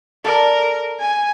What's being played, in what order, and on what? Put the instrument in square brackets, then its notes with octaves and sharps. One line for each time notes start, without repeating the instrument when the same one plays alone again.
[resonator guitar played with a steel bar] A4 D5 [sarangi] A#4
[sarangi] G#5